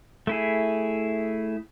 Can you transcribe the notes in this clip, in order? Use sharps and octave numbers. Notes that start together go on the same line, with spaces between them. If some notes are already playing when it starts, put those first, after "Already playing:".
A3 E4 G#4